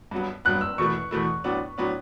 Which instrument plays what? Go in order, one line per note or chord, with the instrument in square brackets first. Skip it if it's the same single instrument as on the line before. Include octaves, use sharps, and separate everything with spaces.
[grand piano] G2 F#3 B3
[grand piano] G2 F#3 B3 [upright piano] F#6
[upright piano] E6
[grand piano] E2 B2 A3 E4 [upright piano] C#6
[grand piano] E2 B2 A3 E4
A2 F#3 B3 D4
A2 F#3 B3 D4